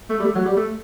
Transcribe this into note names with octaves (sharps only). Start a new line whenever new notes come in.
A3
G3
A3
F#3
G3
A3